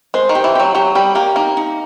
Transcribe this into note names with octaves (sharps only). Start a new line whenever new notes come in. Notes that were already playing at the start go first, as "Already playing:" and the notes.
G#3 C5
D#3
G4
E3
F#3 G4
F#3 G4
G3 G4
A#3 G4
A#3 D#4
D#4